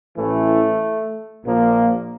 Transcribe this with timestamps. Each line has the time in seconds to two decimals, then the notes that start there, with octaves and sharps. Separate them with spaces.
0.17 A1 A2 E3 A3
1.45 A#1 A#2 F3 A#3